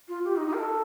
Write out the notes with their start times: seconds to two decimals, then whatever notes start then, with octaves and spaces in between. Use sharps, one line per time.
0.08 F4
0.25 G4
0.36 D#4
0.47 D#4
0.53 A#4
0.59 A4